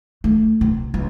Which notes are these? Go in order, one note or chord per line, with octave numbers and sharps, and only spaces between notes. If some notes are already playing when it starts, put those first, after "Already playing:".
A3
C3
C#2